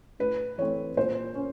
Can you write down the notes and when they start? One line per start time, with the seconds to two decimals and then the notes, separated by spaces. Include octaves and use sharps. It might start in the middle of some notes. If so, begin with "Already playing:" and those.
0.19 A2 B4
0.58 E3 A3 C4 C#5
0.97 A#2 C5
1.35 C#4